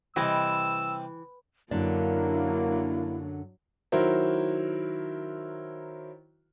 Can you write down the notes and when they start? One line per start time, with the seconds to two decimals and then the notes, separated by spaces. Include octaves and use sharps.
0.16 C3 E3 G3 D#5 G5 E6
1.71 F#2 D3 F#3 A#3 D4 E4 D5
3.92 D#3 F#3 E4 F#4 A#4 C5